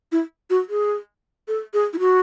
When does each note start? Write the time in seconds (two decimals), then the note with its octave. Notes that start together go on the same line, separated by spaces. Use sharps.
0.12 E4
0.50 F#4
0.69 G#4
1.48 A4
1.74 G#4
1.93 E4
1.99 F#4